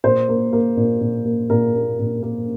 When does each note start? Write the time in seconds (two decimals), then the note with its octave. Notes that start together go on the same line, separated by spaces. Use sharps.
0.04 A#2 C5
0.29 A#3
0.53 A#3
0.77 A#2
1.01 A#2
1.25 A#3
1.50 A#2 A#4
1.74 A#3
1.99 A#2
2.23 A#3